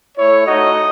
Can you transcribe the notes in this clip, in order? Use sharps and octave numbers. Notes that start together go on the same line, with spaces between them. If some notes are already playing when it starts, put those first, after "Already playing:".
A3 E4 C#5
A3 D#4 F#4 D#5